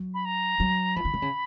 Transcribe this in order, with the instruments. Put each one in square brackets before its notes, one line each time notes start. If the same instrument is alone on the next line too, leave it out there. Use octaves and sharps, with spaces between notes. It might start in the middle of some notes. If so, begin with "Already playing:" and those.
Already playing: [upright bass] F#3
[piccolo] B5
A#5
[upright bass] F#3
[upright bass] F3 [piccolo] B5
[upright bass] D#3
D3
C#3